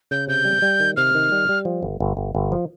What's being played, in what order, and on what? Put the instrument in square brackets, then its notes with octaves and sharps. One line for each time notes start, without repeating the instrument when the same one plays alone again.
[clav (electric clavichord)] C#3 [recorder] G6
[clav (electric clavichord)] C3 [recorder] G6
[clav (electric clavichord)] G3
G3
D#3
[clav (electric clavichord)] C3 [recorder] F6
[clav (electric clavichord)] D#3
G3
G3
F3
G1
G1
G1
G1
F3